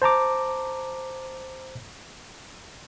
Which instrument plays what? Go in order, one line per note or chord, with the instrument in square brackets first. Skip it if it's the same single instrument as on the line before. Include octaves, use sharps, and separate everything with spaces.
[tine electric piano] C5 A5 A#5 D6